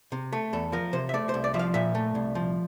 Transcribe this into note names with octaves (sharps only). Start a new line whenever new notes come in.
C3
A3
E2 A4
F3 A#4
C3 C5
E5
A3 D5
C2 C5
D5
F3 E5
F5
A#2 E5
A3
C2
F3